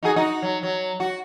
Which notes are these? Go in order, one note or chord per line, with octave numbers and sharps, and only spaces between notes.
D#4 F#4 G#4
D#4 F#4
F#3
F#3
F#4